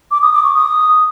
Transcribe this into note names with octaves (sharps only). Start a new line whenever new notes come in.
D6
D#6
D6
C#6
D#6